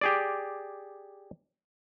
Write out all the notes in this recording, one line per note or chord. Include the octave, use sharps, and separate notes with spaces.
G4 G#4 D5